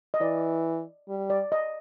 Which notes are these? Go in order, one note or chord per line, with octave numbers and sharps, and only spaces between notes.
D#5
E3 D5
G3
D5
D#5